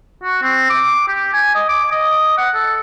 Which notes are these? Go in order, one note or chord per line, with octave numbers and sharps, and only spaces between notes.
F#4
C4
D6
G4
G#5
D#5
D6
D#5
F#5
A4